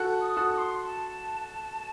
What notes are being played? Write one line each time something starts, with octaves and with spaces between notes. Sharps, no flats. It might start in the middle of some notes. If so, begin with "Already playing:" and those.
Already playing: F#4 A4
D#6
F#4 A4
D#6
C6
A5